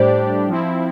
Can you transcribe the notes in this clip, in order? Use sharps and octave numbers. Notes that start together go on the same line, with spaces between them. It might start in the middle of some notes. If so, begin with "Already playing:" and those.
Already playing: A2 G3 D4 G4 C5 D5
F3 C4 E4